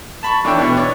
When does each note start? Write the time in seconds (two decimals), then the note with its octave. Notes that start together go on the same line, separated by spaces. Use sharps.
0.23 A5 B5 C#6
0.45 E3 D4 A4 C#5 E5 G5
0.58 B2 B3
0.77 C#5 D5